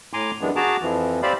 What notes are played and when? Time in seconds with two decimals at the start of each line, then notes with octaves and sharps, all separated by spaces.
0.13 A2 G#5 A#5 C6 D6
0.41 F#2 E3 G3 G#3 B3 D4
0.56 F#4 G#4 A5 A#5 D6
0.82 F2 E3 F3
1.23 C4 G4 C5 D5 F5 B5